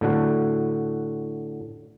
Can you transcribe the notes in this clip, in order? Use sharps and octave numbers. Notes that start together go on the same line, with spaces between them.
A2 D3 F#4